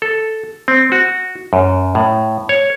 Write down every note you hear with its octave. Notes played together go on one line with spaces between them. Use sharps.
A4
C4
F#4
F#2
A2
C#5